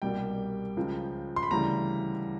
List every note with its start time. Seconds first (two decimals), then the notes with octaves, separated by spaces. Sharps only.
0.02 C2 B2 G3 A#3 G5
0.77 C#2 C#3 F3
1.36 C6
1.43 B5
1.51 D2 C#3 E3 G3 A#5